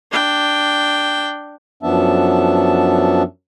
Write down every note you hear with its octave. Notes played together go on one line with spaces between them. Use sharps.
D4 G5
F#2 F3 B3 D4 E5 A5